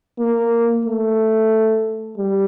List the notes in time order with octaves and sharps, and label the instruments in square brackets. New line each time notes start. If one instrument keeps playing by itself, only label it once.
[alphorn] A#3
A3
G3